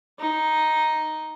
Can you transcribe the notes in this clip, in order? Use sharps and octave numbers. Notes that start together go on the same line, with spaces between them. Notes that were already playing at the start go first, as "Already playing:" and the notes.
D#4